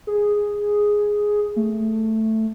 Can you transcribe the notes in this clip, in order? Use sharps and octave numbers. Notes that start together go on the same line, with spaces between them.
G#4
A3